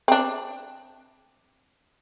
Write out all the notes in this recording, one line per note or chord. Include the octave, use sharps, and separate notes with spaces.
C4 D4